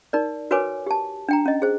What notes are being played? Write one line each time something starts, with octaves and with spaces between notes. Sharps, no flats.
D#4 A#4 D5
F#4 A#4 B4 C#5 G#5 D6
G4 A5
D4 G5 A#5
C#4 D#5
G#4 C5